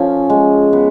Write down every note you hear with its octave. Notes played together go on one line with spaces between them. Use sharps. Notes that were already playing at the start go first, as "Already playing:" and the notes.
Already playing: F3 A3 C#4 F4
G#3
B3